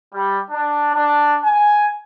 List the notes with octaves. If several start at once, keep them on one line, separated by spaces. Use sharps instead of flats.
G3
D4
D4
G#5